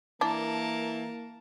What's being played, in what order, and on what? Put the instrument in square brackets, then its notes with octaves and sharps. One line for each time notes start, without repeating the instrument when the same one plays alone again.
[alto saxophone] E3 [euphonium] A#3 [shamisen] D4 [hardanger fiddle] A#4 A5